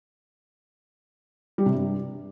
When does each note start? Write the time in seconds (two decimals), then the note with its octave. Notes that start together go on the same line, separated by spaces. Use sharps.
1.58 G3
1.66 C3
1.74 G2